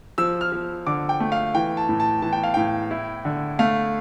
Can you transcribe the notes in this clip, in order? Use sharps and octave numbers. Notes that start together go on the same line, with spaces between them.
F3 E6
F6
F3
D3 D6
G5
A3
F5
E3 G5
A5
A2
A5
E3 A5
G5
F5
A2 G5
E4
D3
A3 F5